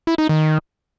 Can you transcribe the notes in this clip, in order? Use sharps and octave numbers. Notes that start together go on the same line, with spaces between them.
E4
D#4
D#3